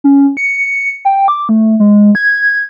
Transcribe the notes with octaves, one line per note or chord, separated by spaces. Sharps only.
C#4
C#7
G5
D6
A3
G#3
G#6